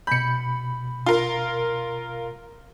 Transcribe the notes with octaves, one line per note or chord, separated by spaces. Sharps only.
B2 B5 G6 C#7
F4 A#4